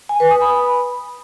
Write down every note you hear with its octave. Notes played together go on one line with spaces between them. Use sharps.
G#5
B4
D#6
B5